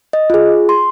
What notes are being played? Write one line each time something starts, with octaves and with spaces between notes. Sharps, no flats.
D#5
F4 G#4
C6